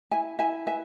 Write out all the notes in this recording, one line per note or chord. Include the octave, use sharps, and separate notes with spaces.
E4 E5 G#5
E4 E5 G#5
B4 E5 G#5